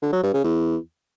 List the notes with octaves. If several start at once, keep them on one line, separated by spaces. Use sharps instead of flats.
D3
F#3
G2
C#3
E2